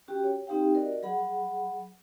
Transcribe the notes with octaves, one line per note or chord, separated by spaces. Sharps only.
C#4 F#4 G4 G5
C#5
C4 D#4 G4 F5 G5
F#4 A#4 D5 D#5
F#3 G#4 F#5 B5